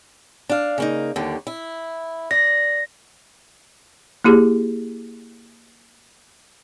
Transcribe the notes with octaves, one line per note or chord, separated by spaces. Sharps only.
D4 F5
C#3 A#3 D#4
D#2 D3 G3
E4
D5 A#6
A#3 E4 G4 G#4